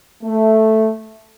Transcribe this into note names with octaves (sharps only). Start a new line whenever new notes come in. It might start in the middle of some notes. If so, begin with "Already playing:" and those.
A3